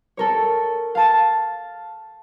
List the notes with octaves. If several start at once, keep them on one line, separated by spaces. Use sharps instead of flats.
A4 A#4 C#5
F5 A5 A6